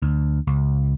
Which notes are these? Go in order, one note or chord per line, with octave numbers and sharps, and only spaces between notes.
D2
C#2